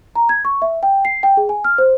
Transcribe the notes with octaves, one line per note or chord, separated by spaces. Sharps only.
A#5
G#6
C#6
E5
G5
C7
G5
G#4
G#5
F6
C5